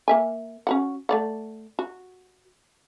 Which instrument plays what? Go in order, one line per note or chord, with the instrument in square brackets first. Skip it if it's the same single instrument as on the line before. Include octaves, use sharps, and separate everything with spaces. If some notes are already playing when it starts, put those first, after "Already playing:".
[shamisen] A#3 E5 G#5
C#4 F#4 F#5
A3 D5 F#5
F#4